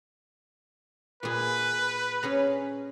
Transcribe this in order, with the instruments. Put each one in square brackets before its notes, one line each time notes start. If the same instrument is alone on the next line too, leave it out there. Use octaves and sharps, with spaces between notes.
[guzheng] A#2 G#4 [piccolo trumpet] B4
[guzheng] C#4 G#4 A#5